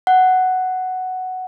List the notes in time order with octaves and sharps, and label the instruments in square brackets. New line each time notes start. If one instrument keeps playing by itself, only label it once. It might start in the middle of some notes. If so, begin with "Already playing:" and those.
[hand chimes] F#5